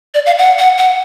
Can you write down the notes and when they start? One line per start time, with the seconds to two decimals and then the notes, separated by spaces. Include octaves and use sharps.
0.14 D5
0.26 F5
0.39 F#5
0.59 F#5
0.78 F#5